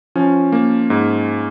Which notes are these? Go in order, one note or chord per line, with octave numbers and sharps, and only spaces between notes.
F3 C#4
A#3
G#2